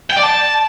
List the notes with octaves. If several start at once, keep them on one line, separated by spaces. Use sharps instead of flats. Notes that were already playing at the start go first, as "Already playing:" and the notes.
G5
D5
A5